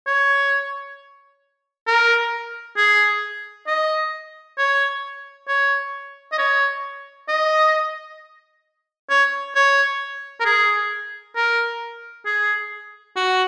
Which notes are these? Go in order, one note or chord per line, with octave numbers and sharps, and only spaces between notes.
C#5
A#4
G#4
D#5
C#5
C#5
D#5
C#5
D#5
C#5
C#5
A#4
G#4
A#4
G#4
F#4